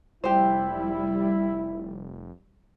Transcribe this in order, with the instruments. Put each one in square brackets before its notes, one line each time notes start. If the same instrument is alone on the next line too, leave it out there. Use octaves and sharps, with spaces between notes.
[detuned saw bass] F1 [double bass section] G3 [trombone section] E4 [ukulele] G4 C5